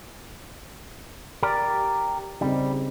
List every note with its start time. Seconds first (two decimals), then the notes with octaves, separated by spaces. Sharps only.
1.43 G4 A#4 D5
2.41 C#3 G3 C4 D#4